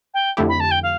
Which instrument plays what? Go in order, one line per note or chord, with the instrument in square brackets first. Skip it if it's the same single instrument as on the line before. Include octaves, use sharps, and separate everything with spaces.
[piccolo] G5
[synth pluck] F2 D3 A3 E4 G4
[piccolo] B5
A5
G5
F5